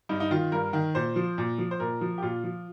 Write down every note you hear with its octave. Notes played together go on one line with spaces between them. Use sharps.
G2 D#4
D#4
D#3 F4
G2 A#4
D#3
A#2 C5
F3
A#2
F3
C5
A#2 A#4
F3
G4
A#2 F4
F3